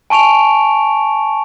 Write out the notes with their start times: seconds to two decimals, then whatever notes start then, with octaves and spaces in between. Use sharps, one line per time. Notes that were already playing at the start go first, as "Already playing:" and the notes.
0.10 G#5 A5 C#6 D7 F7